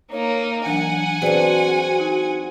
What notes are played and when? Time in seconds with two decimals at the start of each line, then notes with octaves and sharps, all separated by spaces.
0.12 A#3 D#4 C#5
0.66 E3 F#3 D4 F#5 G#5
1.22 C4 D4 F#4 G#4 B4 D5
2.00 D#4